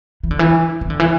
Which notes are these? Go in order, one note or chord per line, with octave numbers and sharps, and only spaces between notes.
E3
D3
E3
E3
D3
E3